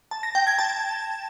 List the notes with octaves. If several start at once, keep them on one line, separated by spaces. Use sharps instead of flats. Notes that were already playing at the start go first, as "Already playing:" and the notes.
A5
A#6
G5
G#6
A5